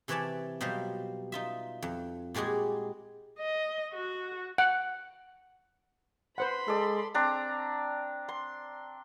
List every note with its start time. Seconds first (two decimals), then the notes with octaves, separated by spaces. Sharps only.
0.08 C3 E3 B4 C#5 D5 A5
0.61 B2 F#3 G3 F4 C5
1.32 D#4 F4 E5
1.82 F2
2.34 A#2 G3 G#3 F#4 G#4
3.39 D#5
3.93 F#4
4.58 F#5
6.38 B4 C5 F#5 B5 C6
6.68 G#3 A4 D5
7.14 C4 D4 A#5
8.29 C6